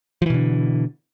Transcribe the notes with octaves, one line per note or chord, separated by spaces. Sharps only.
B2 D3 E3 F3